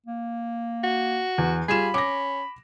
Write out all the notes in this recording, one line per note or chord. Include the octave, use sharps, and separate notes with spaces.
A#3
F#4
E2
G3 F4 G#4 B5 E7
C#4 D6 A#6